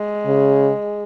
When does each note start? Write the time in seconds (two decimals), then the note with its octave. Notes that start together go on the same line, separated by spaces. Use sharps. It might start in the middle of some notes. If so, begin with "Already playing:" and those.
Already playing: G#3
0.26 C#3